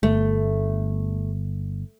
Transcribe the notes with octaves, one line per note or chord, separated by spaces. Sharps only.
G1 A3